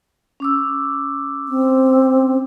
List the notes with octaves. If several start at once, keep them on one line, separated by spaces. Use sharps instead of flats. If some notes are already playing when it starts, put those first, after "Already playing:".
C#4 D6 E6
C4